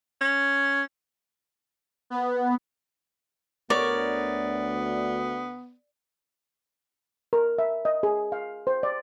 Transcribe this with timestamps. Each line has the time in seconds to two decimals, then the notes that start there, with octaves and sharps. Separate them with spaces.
0.21 C#4
2.10 B3
3.70 D2 B3 A#4 C#5 D5
7.33 A#4
7.58 E5
7.85 D#5
8.03 G#4
8.32 F5
8.67 C5
8.83 D5